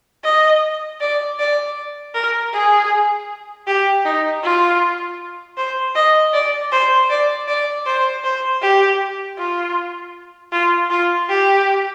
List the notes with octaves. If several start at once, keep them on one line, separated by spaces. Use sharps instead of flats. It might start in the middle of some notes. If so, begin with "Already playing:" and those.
D#5
D5
D5
A#4
G#4
G4
D#4
F4
C5
D#5
D5
C5
D5
D5
C5
C5
G4
F4
F4
F4
G4